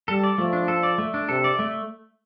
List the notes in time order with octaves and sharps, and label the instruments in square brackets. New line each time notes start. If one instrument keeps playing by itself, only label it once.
[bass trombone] G3 [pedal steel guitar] A4
[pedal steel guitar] D5
[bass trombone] F3 [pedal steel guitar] A3
[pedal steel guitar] D4
A4
D5
A3
D4
[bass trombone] C3 [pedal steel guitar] A4
[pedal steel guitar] D5
A3